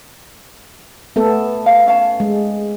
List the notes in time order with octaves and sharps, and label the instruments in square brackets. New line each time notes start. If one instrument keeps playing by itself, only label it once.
[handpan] A3 B3 A4
[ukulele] F5
C#4 F5 A5
[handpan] G#3